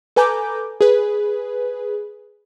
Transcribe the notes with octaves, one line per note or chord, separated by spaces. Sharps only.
A4 B4 G#5 A#5 D6 G6
G#4 B4